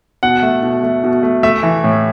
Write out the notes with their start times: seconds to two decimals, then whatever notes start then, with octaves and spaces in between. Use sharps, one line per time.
0.23 B2 F#5
0.43 A3
0.63 B2
0.83 A3
1.04 B2
1.23 A3
1.43 A3 E5
1.63 E3
1.84 A2